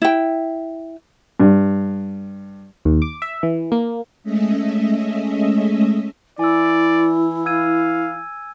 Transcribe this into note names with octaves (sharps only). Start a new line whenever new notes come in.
E4 G5
G2
D#2
D6
E5
E3
A#3
G#3 A3 C#4 D#5 E5
E3 E4 D5 G#5 E6
F5 E6 G#6 D#7